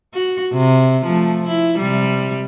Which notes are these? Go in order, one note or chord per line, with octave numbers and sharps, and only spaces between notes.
F#4
C3
F3 A3
E4
C3 G3